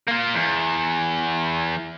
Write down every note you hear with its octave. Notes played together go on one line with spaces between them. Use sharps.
A#3 F4
E2